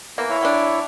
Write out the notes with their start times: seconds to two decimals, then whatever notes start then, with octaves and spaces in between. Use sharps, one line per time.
0.18 E3 A#3 B3
0.30 E4 C#5 E5
0.43 G3 D4